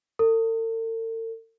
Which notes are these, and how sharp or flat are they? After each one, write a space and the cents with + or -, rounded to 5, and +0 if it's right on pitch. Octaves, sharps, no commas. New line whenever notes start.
A4 +45